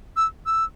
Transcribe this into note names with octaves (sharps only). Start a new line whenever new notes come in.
E6
E6